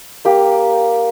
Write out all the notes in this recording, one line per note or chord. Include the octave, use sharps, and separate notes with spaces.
A#3 G4